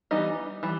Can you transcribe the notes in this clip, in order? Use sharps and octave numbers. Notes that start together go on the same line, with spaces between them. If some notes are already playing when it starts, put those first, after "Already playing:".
E3 G3 B3 D#4 D#5
E3 G3